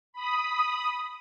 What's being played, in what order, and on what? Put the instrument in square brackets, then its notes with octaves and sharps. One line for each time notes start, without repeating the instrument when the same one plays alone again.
[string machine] B5 D#6